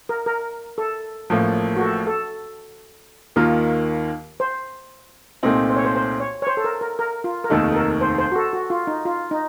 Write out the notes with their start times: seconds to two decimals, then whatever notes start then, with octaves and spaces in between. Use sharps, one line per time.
0.09 A#4
0.26 A#4
0.78 A4
1.30 A1 A2 F3 A#3
1.77 F#4
1.81 A4
2.07 A4
3.36 D#2 D#3 A#3 F4 A#4
4.40 C5
5.43 C2 A#2 A3 C4 D#4 C5
5.69 C5
5.76 C#5
5.85 C5
5.95 C5
6.20 C#5
6.42 C#5
6.47 C5
6.57 A4
6.64 A#4
6.81 A#4
6.99 A#4
7.24 F4
7.44 A#4
7.50 F1 D#2 D#3 A3 D#4 A4
7.72 A4
7.76 A#4
8.01 C5
8.18 C5
8.32 F#4
8.36 A4
8.53 F#4
8.70 F4
8.87 D#4
9.05 F4
9.31 D#4